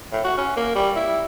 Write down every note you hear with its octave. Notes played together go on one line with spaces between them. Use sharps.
A2
F#4
C#4
A#3
G3
E4